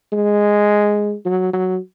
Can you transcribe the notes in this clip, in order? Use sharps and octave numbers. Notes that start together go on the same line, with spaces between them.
G#3
F#3
F#3